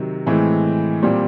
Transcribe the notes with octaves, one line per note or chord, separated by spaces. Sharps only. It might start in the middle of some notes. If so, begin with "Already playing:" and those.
Already playing: C3 D#3 F#3
A2 E3 G#3 C4
A#2 G3 C4